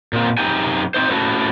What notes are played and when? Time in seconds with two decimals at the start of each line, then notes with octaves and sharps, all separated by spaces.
0.13 A#2 C4
0.37 F#2 C3 D#4 G4 G5 G#5
0.94 C4 C#4 D#4 C5
1.11 A2 C#4 F#4 A4